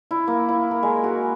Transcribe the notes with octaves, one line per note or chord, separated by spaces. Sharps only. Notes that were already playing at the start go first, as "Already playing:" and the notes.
E4
A#3
E4
A#4
G#3
F#4